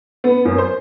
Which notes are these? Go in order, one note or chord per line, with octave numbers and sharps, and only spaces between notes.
B3
F#2
C5